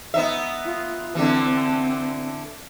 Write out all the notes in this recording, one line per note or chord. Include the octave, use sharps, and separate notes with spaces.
B3 D#4 E5
F4
D3 E3 C4